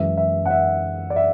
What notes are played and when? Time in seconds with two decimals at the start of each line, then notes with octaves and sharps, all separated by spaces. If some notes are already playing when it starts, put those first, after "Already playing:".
Already playing: F#2 E3 G#3 E5
0.17 E5
0.46 F#5
0.50 E5
1.10 D5
1.16 E5